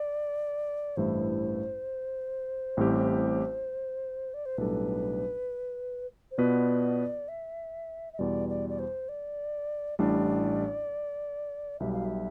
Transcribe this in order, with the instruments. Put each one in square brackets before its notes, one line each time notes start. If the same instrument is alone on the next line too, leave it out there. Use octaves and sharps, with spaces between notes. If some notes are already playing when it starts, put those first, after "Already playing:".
Already playing: [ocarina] D5
[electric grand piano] A1 G2 E3 A3 E4 [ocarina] C5
[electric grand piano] A1 A2 G3 C4 G4
[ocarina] D5
C5
[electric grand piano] B1 A2 G3 D4 A4 [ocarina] B4
[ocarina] C5
[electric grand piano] B2 B3 F4 B4 [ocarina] D5
[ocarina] E5
E5
[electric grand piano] E2 B2 G3 [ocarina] D5
[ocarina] D5
D5
C5
D5
[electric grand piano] A1 A2 G3 D4 [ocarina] D5
[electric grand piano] B1 B2 G3 [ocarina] E5
[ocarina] F5
E5